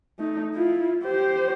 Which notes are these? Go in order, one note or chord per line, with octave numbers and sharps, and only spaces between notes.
A3 D#4
E4 F4
G4 C5